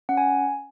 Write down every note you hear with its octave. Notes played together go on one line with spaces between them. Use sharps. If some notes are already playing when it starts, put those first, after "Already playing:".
C#4 F#5
G#5